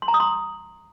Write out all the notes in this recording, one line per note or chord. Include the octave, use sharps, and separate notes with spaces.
C6
A#5
D#6
C6